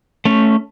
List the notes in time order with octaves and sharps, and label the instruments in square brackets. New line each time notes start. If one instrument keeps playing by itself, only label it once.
[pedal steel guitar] A3 C#4